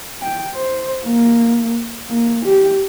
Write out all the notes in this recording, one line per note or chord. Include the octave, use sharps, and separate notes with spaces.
G5
C5
A#3
A#3
G4